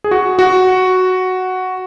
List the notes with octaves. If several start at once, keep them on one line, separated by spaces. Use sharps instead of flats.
G#4
F#4
F#4